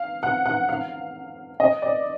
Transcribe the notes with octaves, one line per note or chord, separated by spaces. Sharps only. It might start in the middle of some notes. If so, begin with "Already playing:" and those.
Already playing: F5
F#5
F#5
F5
D#5
D5